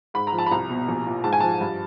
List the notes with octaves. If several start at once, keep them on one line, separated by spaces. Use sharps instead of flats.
G#2 B5
A#5
F3
A5
B5
C2 A#5
B2
A#1
A#2
G#2 A5
G#5
F3 A5
G2